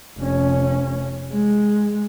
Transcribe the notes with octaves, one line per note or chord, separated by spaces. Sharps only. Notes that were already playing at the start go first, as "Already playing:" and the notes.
F1 C#4
G#3